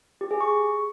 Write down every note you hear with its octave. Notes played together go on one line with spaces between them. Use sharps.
G4
G#4
C#6